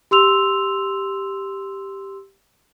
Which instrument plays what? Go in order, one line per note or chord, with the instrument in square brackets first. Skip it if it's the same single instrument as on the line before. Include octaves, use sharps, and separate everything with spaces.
[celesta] G4 C6 E6 F7